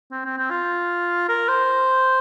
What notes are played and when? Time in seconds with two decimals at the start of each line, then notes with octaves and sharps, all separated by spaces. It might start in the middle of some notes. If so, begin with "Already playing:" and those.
0.12 C4
0.25 C4
0.38 C4
0.51 F4
1.29 A#4
1.48 C5